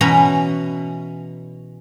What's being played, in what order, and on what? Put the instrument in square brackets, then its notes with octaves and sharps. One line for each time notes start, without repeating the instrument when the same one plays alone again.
[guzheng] B2 E3 C#4 A#5 B5